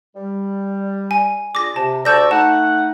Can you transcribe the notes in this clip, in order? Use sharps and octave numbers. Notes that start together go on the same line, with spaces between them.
G3
G#5
D4 F4 G#4 D6 A#6
C3 A5
D2 D5 A5 C#6 E6 G6 A#6
A3 D#4 F#5 A5